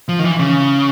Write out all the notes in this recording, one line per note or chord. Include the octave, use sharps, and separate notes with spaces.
F3
D#3
E3
C#3